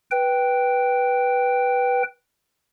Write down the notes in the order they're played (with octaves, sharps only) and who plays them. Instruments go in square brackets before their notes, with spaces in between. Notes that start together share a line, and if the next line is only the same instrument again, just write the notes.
[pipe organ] B4 G5